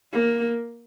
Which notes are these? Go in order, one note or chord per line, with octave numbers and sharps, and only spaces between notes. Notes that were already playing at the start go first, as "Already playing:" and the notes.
A#3